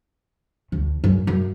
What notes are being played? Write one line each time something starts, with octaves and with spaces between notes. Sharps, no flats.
D2
F#2
F#2